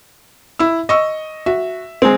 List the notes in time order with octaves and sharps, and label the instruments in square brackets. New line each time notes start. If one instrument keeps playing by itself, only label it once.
[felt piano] E4 E6
D#5 C#6 E6
[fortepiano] F#4 [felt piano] E5
[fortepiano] G#3 C4